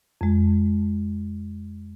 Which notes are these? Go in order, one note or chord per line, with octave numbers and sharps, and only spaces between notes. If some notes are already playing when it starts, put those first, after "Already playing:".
F2 G#3